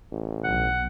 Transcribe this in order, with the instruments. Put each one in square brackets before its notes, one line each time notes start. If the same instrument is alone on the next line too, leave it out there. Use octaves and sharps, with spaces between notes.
[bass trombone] A1
[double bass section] B1 [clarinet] F#5